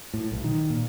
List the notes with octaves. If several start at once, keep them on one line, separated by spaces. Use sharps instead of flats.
A2
B1
D#3
A#2